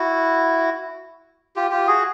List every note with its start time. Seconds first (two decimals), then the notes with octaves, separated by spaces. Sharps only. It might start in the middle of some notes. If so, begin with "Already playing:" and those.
Already playing: E4 F#4
1.56 F4 G4
1.71 F4 G4
1.87 F#4 G#4